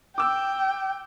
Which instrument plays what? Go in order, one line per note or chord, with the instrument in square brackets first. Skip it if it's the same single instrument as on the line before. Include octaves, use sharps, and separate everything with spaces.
[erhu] G5 [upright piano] D6 E6